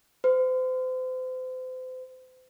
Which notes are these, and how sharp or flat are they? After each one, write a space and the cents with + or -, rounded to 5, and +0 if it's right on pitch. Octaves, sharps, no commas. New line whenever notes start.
C5 -35